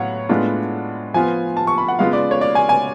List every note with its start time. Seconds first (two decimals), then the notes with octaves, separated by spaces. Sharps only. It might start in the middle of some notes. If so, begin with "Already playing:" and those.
Already playing: A2 F#3 B3 C#5 F5 F#5
0.29 A2 G#3 B3 D4 F4
1.14 F3 B3 F4 G#5
1.57 A5
1.67 C#6
1.78 B5
1.88 F#5
1.99 C#3 G#3 B3 F4 F5
2.13 D5
2.31 C#5
2.41 D5
2.55 G#5
2.69 G#5